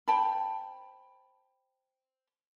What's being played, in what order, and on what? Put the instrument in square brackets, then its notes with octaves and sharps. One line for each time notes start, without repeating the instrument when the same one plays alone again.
[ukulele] C5 G5 A5 B5